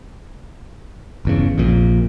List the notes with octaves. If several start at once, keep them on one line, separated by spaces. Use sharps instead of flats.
G1 E2 C#3
A#1 F2 A#2